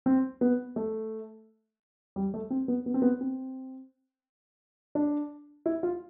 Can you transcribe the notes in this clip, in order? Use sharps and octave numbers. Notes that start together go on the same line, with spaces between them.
C4
B3
A3
G3
A3
C4
B3
B3
C4
B3
C4
D4
E4
F4